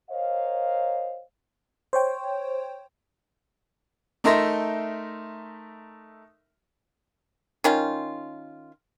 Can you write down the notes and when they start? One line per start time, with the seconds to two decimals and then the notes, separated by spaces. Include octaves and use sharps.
0.11 A#4 C5 C#5 D#5 F5
1.93 C5 C#5 G5
4.24 A3 D#4 A#4 E5 C6 A#6
7.64 D#3 C#4 F4